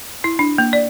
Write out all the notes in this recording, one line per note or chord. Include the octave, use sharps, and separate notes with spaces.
E4
D4
A#3
D5